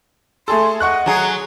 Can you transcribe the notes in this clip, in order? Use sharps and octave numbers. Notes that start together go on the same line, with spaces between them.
A3 G#4 A4 C6
D#5 F#5 C#6 F#6
F#3 G#4 A#5